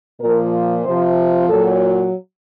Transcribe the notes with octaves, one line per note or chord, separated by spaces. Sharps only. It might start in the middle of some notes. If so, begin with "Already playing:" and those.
A#2 F3 A#4
C3 F3 C5
A#2 F#3 A4